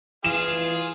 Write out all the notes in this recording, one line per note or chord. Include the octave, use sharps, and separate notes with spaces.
E3 F4 G#4 F5 E7